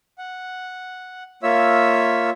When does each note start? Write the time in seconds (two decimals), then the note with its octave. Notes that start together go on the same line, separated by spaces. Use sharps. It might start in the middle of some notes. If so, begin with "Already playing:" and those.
0.18 F#5
1.43 A#3 F4 C#5 E5 E6